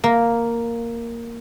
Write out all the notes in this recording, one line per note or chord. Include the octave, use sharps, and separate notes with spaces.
A#3